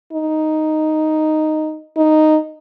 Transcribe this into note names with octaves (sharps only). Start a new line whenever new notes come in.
D#4
D#4